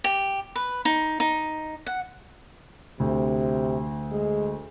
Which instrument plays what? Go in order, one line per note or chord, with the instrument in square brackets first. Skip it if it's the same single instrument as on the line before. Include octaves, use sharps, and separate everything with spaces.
[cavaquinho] G4
B4
D#4
D#4
F#5
[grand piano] D2 [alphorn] C3
[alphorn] G#3